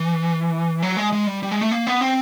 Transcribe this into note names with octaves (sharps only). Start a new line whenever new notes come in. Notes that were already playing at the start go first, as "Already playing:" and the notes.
Already playing: E3
F#3
G#3
G#3
G3
G3
G#3
A3
A#3
B3
C4